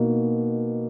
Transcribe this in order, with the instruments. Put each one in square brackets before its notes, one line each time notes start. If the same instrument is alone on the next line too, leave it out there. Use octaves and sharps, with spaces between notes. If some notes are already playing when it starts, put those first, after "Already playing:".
Already playing: [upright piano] B2 A#3 D#4